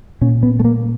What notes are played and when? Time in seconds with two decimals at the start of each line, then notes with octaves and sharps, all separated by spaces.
0.21 A#2 C#4
0.43 B3
0.60 A3
0.65 A#3